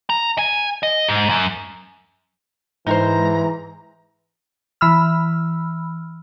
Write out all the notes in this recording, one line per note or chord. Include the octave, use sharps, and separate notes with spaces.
A#5
G#5
D#5
G#2
F#2
G#2 E3 D#4 A#4 C5 A#5
E3 B5 E6 F6